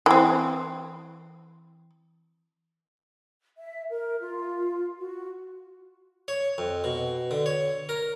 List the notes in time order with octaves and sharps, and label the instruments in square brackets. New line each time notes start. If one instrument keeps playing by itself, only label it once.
[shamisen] E3 C4
[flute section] E5
A#4
F4
F#4
[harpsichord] C#5
F2
B2
D3
C#5
A#4